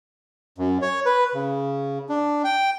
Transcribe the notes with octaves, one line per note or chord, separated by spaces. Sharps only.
F#2
C#5
B4
C#3
D4
G5